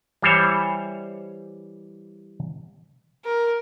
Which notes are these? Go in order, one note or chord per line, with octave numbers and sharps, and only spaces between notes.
E3 G3 C5 C#5
A#4